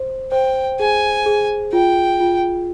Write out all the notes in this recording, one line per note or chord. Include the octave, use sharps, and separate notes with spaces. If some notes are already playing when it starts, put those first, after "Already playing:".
Already playing: C5
C5 G5
G#4 G#5
G#4
F4 G5
F4